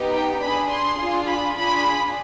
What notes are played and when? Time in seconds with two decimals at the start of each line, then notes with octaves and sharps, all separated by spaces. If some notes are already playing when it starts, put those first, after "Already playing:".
Already playing: B3 D#4 G4
0.12 G5
0.40 D4 G#4 B5
0.69 C6
0.98 D4 F4 G#4
1.26 B5
1.55 D4 F4 G#4 B5